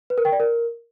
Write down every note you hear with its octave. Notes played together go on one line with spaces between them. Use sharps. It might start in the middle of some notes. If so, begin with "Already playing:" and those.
B4
A#4
G5
D5
A#4